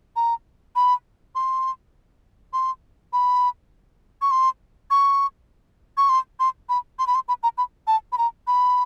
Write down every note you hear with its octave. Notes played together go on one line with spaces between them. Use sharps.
A#5
B5
C6
C6
B5
C#6
C6
C#6
C#6
C6
C6
B5
C6
B5
C6
B5
A#5
B5
A5
B5
A#5
B5